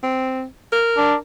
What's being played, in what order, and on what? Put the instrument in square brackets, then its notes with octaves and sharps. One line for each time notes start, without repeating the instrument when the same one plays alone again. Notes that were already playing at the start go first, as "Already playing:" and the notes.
[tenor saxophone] C4
A#4
[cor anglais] D4